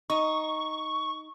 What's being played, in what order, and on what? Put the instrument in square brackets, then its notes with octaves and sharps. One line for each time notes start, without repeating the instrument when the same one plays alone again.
[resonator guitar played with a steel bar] D#4 [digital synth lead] C#6